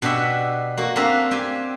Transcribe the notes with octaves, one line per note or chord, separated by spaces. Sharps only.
B2 D4 F#4 G4 E5
A#3 F#4
A#3 C4 D4 A#4 E5 F5
C4 G4 G#5